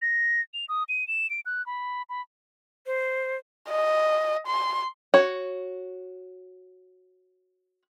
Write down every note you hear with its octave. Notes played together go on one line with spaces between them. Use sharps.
A#6
F7
D#6
D#7
E7
D7
F#6
B5
B5
C5
D#5
C6
F#4 C#5